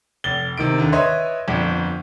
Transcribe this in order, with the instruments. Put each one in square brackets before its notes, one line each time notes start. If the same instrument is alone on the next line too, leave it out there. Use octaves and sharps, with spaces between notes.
[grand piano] F1 A6 G7
C3 D#3 D7
D#2 D3
B4 C#5 D#5 E5 C6
G1 F2